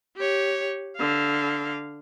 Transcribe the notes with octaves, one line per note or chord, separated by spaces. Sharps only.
G4 C#5
D3 F5